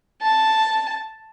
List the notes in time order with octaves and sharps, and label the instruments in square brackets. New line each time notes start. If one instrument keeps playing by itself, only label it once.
[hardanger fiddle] A5